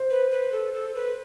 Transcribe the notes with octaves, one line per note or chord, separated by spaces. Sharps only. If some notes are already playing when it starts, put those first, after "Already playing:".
Already playing: C5
B4
B4
A4
A4
B4